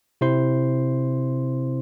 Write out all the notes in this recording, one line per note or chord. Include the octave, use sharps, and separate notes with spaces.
C3 C4 E4 C5 C6